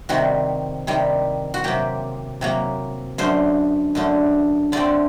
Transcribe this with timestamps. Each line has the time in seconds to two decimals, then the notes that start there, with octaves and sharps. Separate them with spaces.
0.09 C3 D#3 G3 F#4
0.87 C3 D#3 G3
1.54 F#4
1.64 C3 F#3 A#3 G4
2.41 C3 F#3 A#3
3.18 F#2 D3 A3 C5
3.95 F#2 D3 A3
4.72 D3 A3 C4 D5